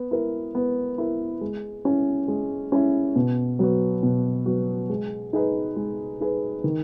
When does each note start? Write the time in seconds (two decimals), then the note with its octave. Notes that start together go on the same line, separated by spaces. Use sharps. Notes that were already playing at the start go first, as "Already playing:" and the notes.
Already playing: B3
0.11 E4 A#4
0.55 B3
0.98 E4 A#4
1.41 G#3
1.85 C#4 E4
2.28 G#3
2.72 C#4 E4
3.16 B2
3.59 F#3 B3 F#4
4.03 B2
4.46 F#3 B3 F#4
4.90 G#3
5.33 D#4 G#4 B4
5.76 G#3
6.20 D#4 G#4 B4
6.64 D#3